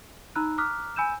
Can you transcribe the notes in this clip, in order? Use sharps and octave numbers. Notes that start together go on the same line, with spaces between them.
D#4 A#5 B5 E6 F#6
A#5 D6 D#6 F6 F#6 B6
G#5 B5 E6 G6 D#7 E7